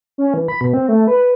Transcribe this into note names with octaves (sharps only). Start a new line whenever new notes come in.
C#4
E3
B5
B2
C4
A3
B4